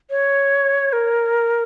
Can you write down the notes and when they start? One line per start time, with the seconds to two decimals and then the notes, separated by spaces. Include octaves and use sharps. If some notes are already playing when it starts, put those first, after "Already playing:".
0.10 C#5
0.93 A#4